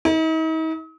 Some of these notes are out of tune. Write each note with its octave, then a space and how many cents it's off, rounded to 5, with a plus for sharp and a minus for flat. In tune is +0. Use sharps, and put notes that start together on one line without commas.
D#4 +45